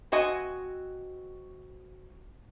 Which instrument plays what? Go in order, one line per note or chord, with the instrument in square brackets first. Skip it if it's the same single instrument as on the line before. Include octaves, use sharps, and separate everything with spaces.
[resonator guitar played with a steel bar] C4 F#4 D#5 G#5